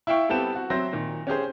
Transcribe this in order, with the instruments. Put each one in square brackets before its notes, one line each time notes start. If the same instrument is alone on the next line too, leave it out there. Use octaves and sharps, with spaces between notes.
[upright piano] E4 E5 F5 G5 C#6
G3 B3 C4 G4 A4 E7
F#4
F#3 C4 C5 E5 C6 A#6
A#2 D#3
C#4 G4 G#4 C5